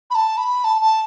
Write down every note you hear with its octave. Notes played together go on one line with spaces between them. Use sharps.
B5
A5
B5
A5
A5